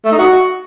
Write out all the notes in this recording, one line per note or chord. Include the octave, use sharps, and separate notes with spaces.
A3
D#4
F#4